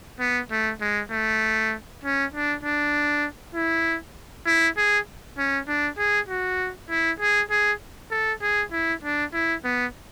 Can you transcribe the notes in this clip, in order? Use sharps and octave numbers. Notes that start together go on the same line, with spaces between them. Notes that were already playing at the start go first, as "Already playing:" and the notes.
B3
A3
G#3
A3
C#4
D4
D4
E4
E4
G#4
C#4
D4
G#4
F#4
E4
G#4
G#4
A4
G#4
E4
D4
E4
B3